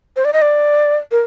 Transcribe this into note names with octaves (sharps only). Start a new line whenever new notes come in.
C5
D5
D#5
D5
A#4